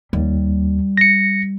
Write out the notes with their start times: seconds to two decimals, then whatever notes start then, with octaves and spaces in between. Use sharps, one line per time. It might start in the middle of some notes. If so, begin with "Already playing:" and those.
0.13 D#2 G3
0.97 A#6 C#7